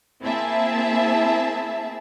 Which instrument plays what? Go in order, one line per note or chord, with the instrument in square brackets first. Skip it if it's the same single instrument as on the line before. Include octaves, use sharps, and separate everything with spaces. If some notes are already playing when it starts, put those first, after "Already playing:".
[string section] A#3 C4 E4 G#4 E5 A5